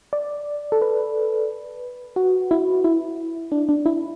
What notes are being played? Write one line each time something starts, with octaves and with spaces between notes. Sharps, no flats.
D5
A4
B4
F#4
E4
E4
D4
D4
E4